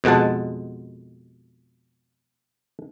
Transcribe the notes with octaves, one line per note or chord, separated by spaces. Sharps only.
F2 B2 G#3 F#5 A5